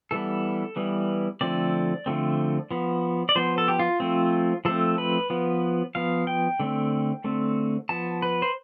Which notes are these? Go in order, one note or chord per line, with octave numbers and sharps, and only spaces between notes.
E3 G3 B3 A4
E3 G3 B3
D3 F3 A3 C4 D5
D3 F3 A3 C4
F3 B3
D5
F3 B3 C5
A4
G4
F4
F3 A3 C4
F3 A3 C4 A4
B4
F3 B3
F3 B3 F5
G5
D3 A3 C4
D3 A3 C4
F3 B3 A5
B4
C5